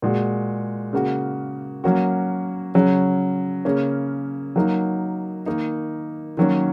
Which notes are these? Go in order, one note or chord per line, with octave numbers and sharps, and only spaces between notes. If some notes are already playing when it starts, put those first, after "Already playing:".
A#2 G#3 F#4
C#3 A#3 F#4
F#3 A#3 C#4 F#4
C#3 F#3 C#4
C#3 A#3 C#4
F#3 A#3 D#4
D#3 A#3 D#4
D#3 F#3 A#3 C#4